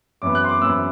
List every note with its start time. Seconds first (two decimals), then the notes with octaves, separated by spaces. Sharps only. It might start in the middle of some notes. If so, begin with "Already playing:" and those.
0.22 F#2 E3 B3 D6
0.35 F#6
0.44 C6
0.49 D6
0.62 F#2 E3 B3 E6